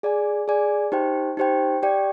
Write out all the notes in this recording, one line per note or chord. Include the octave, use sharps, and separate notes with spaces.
G#4 D5 G#5
G#4 D5 G#5
D#4 G4 C5 G5
D#4 G4 C5 G5
G4 D5 G5